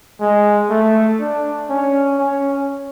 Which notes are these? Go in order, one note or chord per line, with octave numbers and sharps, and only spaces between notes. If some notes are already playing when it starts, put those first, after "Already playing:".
G#3
A3
D4
C#4
C#4